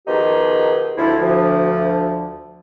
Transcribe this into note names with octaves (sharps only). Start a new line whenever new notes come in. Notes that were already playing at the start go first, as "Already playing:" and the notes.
B2 D#3 F3 D#4 G4 G#4
D2 F3 E4
D2 F3